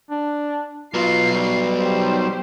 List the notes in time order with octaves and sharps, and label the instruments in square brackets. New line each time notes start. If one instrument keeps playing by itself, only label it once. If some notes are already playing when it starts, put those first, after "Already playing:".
[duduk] D4
[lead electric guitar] F#3 B3 [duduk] F4 [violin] C7
[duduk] G3
[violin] G4 C5